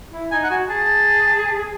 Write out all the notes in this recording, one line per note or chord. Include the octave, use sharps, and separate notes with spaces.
E4
D#4 G#5
F#5
F#4 G#5
G#4 A5